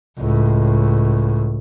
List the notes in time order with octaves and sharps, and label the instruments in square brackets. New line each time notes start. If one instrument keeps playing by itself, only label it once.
[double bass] C#2 A2